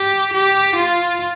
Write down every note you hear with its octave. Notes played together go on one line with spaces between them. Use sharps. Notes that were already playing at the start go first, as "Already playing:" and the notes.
Already playing: G4
G4
F4